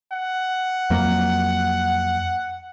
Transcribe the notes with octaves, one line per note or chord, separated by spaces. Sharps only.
F#5
F2 F#3 A#3